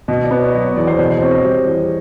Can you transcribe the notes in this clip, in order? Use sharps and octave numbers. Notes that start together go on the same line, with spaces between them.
B2 D#5
D5
B3
C#5
D#5
F#3 D5
C#5
E2 D5
C5
B2 C5
C5
C4 C#5
D#5
G3
E2